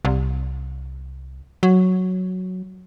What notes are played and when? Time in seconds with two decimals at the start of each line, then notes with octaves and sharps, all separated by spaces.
0.05 C2
1.63 F#3